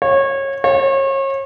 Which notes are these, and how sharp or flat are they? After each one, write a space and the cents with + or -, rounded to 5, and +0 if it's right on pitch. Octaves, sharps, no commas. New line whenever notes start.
C#5 -25
C#5 -35